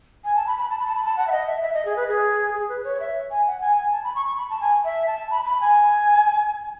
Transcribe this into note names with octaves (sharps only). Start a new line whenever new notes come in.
G#5
A5
B5
B5
A5
B5
A5
B5
A5
F#5
E5
D#5
E5
E5
D#5
G#4
B4
G#4
G#4
B4
C#5
E5
G#5
F#5
G#5
G#5
A5
B5
C#6
C#6
B5
A5
G#5
E5
A5
B5
B5
G#5